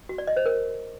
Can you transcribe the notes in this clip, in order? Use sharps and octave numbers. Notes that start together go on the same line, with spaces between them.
F#4
D5
D#5
C5
A#4